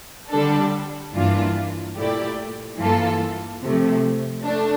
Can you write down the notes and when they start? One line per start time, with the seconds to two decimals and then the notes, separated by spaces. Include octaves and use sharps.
0.30 D3 G3 D4 A4
1.14 G2 E3 A#3 D4 F4
1.95 A#2 A3 E4 G4 D5
2.78 G2 E3 A#3 F4 A4
3.61 C3 F3 A3
4.44 A3 D4